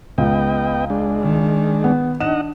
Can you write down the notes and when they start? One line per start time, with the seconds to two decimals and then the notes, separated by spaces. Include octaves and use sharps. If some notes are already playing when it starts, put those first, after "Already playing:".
0.18 C#2 B3 D#5 G5
0.90 G#3 D4
1.20 D#3
1.84 B3
2.21 D4 D#4 D#5 F#5 E7